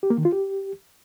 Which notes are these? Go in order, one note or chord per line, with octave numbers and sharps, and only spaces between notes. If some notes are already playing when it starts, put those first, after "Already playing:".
G4
A#3
D#3
F4
G4